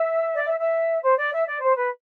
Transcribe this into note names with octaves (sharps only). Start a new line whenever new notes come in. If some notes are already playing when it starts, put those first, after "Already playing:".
Already playing: E5
D5
E5
E5
C5
D5
E5
D5
C5
B4